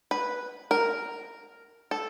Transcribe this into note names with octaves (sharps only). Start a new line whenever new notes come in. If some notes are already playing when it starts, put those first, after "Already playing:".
B4
A#4
A4